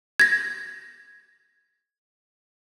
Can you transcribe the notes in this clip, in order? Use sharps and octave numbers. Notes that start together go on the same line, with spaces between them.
G#6 A#6